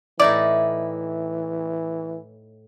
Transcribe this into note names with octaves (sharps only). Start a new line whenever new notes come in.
A2 E3 D#4 E4 D5